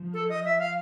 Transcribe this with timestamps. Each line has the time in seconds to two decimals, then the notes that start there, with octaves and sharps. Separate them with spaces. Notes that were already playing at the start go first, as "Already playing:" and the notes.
Already playing: F3
0.14 A4
0.29 D#5
0.45 E5
0.59 F5